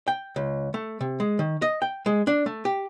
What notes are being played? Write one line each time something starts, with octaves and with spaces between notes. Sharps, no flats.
G5
C#2
A3
C3
G#3
D#3
D#5
G5
G#3
D4
A3
G4